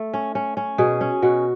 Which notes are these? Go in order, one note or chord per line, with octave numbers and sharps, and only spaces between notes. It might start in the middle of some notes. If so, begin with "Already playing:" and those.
Already playing: A3
C#4
C#4
C#4
B2 G#4
C#4
B2 F#4